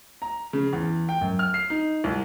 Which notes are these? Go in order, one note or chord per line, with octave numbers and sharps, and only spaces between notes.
A#5
C#3
E2
G5
F#2
F6
C7
D#4
C2